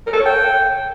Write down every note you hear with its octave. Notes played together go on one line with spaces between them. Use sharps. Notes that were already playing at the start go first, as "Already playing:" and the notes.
A#4
A4
C#5
G5